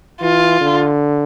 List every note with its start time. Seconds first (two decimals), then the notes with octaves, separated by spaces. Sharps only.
0.21 E3 F4
0.61 D3